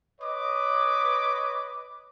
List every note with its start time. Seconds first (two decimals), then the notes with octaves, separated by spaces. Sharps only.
0.21 B4 C#5 D#5 D6